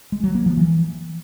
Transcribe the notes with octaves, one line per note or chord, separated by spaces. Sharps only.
G#3
F#3
A#3
F3
E3